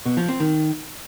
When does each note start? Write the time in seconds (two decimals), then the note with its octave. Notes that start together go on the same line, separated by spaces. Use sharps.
0.06 B2
0.17 F3
0.28 C4
0.40 D#3